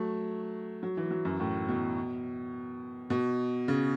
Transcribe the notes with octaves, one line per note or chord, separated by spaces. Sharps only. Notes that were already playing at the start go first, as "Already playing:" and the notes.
Already playing: F#3 A3
F#3
E3
F#3
F#2
A2
B2
B2
C#3